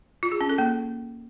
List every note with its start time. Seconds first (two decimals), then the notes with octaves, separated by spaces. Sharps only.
0.23 F4
0.32 G#4
0.41 C#4
0.50 A4
0.58 A#3